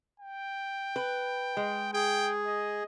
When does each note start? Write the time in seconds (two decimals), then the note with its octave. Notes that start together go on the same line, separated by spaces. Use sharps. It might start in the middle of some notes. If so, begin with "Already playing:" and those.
0.20 G5
0.96 B4
1.57 G#3
1.94 G#4 G5
2.46 D#5